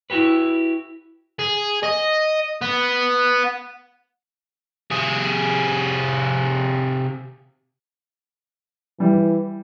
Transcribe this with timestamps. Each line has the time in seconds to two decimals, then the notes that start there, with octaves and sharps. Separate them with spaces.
0.10 E4 F#4 G4 B4
1.39 G#4
1.83 D#5
2.61 B3
4.91 C3 G#4
9.00 E3 G3